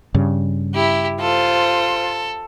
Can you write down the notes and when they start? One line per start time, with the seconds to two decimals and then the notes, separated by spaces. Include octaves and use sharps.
0.14 G2 C#3
0.74 E4 G4
1.20 F4 A4 C5